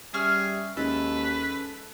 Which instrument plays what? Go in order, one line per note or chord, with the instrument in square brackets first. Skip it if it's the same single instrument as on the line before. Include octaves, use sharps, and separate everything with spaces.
[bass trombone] G3 [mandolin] C#4 E5 F6 [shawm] G#4
[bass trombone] D#2 [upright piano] G#3 C#4 [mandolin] A4 [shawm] B4